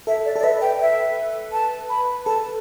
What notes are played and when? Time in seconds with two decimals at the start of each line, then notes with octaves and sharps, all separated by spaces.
0.07 A4 E5
0.25 D5
0.36 A4
0.39 D5
0.43 B4 E5
0.61 G5
0.80 E5
1.52 A5
1.90 B5
2.26 A4 A5